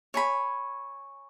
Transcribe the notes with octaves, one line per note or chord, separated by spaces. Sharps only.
C#5 G#5 B5